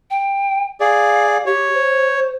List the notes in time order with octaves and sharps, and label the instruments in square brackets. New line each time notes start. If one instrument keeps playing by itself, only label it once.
[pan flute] G5
[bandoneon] G#4 D5 [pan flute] F5
[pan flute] G4 [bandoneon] C#5
[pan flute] C5